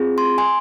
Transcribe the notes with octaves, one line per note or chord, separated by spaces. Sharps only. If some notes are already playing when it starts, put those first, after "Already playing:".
Already playing: C4 F4 G#4
C6
G#5 C6